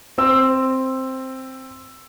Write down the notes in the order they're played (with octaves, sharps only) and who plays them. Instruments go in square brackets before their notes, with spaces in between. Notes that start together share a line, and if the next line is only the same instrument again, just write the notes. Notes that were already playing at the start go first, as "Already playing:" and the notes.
[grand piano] C4 E6